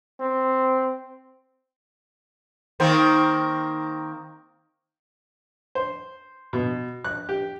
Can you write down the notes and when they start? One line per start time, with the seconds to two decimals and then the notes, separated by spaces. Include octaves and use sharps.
0.20 C4
2.80 D#3 A#3 C4
5.75 C5
6.53 B2
7.04 F#6
7.29 G4